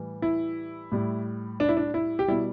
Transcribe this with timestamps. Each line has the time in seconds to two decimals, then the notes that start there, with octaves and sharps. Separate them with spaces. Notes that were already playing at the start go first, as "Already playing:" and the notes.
Already playing: A2 E3 G3
0.22 E4
0.92 A2 G3
1.60 D4
1.69 E4
1.77 D4
1.94 E4
2.19 G4
2.28 B2 G3 E4